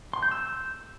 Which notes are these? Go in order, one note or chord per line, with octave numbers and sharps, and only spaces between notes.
C6
G6
E6